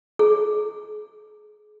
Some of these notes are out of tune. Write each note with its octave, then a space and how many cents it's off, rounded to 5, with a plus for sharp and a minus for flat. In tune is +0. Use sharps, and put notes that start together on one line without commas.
G#4 +30